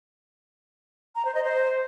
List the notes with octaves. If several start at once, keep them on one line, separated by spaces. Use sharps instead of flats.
A#5
C5
D#5
C5